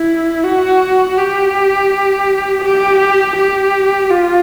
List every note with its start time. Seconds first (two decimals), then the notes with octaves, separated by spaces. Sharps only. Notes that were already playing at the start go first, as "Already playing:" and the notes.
Already playing: E4
0.44 F#4
1.17 G4
2.64 G4
3.36 G4
4.10 F4